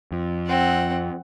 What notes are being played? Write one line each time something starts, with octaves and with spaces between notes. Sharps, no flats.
F2
C4 F#5